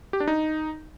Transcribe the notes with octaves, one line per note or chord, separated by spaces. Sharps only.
G4
D4
D#4